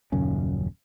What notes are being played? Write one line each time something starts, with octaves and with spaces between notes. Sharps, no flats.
D#1 F#2 C#3 C#4